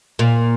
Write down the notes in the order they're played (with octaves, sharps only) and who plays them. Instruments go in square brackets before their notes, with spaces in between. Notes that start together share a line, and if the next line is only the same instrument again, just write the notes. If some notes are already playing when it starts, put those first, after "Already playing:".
[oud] A#2